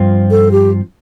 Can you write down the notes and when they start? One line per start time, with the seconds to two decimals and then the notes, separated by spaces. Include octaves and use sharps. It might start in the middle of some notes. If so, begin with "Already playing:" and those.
Already playing: G2 F3 C4 F4
0.31 A4
0.52 G4